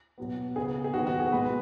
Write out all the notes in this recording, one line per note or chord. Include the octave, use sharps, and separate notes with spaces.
B2 F#3 B3
C#3 B3 G#4
G#4
D#3 F#3 B3 F#4
F#4
G#4
B2 G#3 B3 B4